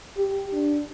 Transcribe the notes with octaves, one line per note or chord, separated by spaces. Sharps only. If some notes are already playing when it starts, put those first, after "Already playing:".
G4
D4